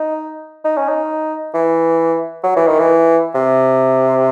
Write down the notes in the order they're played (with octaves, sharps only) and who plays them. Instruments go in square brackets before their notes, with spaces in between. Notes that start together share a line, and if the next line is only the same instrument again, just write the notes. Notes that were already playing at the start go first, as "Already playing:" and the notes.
Already playing: [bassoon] D#4
D#4
C#4
D#4
E3
F#3
E3
D#3
E3
C3